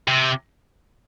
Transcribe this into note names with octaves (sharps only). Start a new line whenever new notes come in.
C3